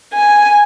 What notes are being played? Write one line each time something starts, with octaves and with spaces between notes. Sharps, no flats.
G#5